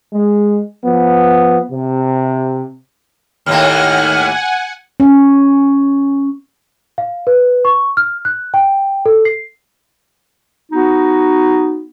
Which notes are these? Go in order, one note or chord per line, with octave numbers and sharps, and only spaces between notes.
G#3
F3 B3
C3
D#2 A2 A#3 F#5 G#5 F6
C#4
F5
B4
C#6
F6
F#6
G5
A4
C7
B3 D#4 F#4